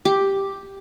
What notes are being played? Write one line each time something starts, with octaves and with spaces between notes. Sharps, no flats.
G4